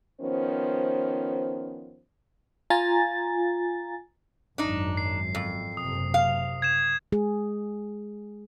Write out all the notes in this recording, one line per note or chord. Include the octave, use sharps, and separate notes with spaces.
D#3 F3 B3 C#4 C5
F4 G#5 A#5 A6
G#1 F#2 D4 D#4
C7
F2
F#1 C3 D#6
F5
G#6 E7
G#3 G#4